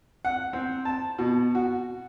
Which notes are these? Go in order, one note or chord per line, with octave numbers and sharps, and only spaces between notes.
F#5
C4
A5
B2
F#4